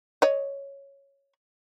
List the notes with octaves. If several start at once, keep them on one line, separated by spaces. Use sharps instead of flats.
C#5 D#5